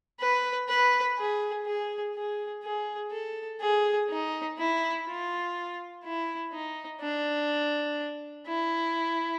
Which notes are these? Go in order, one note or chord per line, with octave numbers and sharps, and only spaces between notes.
B4
B4
G#4
G#4
G#4
G#4
A4
G#4
D#4
E4
F4
E4
D#4
D4
E4